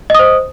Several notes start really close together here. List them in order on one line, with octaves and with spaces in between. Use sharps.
D#5 D#6 C5